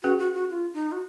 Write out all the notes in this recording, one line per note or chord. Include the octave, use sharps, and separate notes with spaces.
C#4 F#4 G#4 B4
F#4
F#4
F4
D#4
F#4